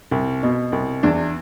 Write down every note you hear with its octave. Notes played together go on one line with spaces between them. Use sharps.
C2
B2
C2
E2 D4